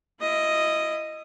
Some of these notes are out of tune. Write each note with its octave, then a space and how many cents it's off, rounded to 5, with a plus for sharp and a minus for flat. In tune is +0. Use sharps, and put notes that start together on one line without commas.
E4 +25 D#5 +0